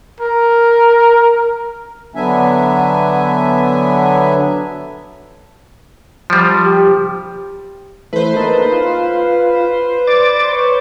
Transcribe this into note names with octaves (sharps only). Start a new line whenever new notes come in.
A#4
D3 F#3 B3 D4 E5 G#5
F3 G3
G4
E3 A3 B4 C5
A#3 D#4 A4
F4
D5 D6 A6
C#5